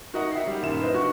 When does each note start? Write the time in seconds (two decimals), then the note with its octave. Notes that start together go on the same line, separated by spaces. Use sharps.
0.14 D#4 F#4 A#4 D#5 E5 F#5
0.32 E5 F#5 G5 C7
0.44 G3 D#4
0.62 F#1 A#2 D#3 E4 E7
0.82 B4 C5 D#5 F5
0.93 G2 D#3 F#4 C#6 F#6